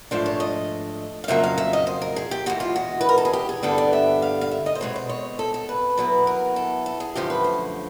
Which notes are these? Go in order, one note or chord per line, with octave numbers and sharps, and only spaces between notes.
G#2 F3 A3 D4 C5
C#5
D#5
F5
F2 C#3 F#3 A#3 E5
F5
E5
D#5
C5
A#4
G#4
G4
E2 B2 G#3 F#4
F4
F#4
B4
A#4
A4
G#4
G4
G#4
G2 D3 G3 B3 A4
D5
E5
F5
F5
E5
D#5
C5
B2 G#3 C4 C#5
C5
C#5
A4
A4
B4
B2 F#3 B3 E4
A#4
A4
A4
G#4
F#2 D3 F3 A3 G4
B4
C5